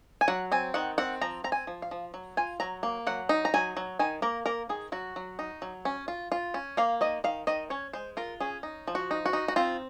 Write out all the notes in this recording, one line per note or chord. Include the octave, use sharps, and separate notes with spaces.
G#5
F#3 F#5
C4 G#5
D#3 F#5
C4 F#5
F3 A#5
C4 A#5
G#5
F3
F5
F3
F#3
F4 G#5
F#3 A#5
A#3
F#3 F#5
D#4
A#5
F#3 G#5
F#3
D#3 G#5
A#3 A#4
A#3 A#4
D#3 G#4
F#3 F#4
F#3
D#4
F#3
C#4
F4
F4
C#4
A#3 F5
D#3 D#5
D#3 F5
D#3 D#5
C#4 C#5
G#3 C5
F4 A#4
C#4 G#4
D#4
F3
F#4
D#4
F#4
D#4
F#4
C4 F4